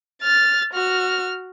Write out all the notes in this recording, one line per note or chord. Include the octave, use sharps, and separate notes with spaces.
F6 A6
F#4 F6